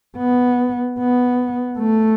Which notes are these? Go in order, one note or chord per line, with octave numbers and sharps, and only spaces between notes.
B3
B3
A3